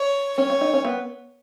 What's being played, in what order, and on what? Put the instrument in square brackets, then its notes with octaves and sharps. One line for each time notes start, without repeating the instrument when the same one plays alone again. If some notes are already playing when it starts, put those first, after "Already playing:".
Already playing: [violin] C#5
[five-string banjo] C#4 [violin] C#5
[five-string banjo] C#4
D#4
C#4
B3